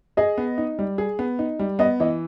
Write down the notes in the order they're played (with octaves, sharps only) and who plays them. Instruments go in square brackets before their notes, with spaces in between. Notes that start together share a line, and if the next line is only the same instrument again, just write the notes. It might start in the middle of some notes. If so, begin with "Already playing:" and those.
[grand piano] G#4 [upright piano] D#5
[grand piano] B3
D#4
G3
G#4
B3
D#4
G3
[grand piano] B3 [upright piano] D#5
[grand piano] E3 [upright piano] D#5